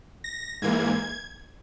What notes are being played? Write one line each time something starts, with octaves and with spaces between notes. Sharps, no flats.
A#6
G#2 E3 A#3 G#6